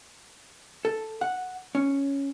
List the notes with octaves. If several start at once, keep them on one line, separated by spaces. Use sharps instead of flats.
A4
F#5
C#4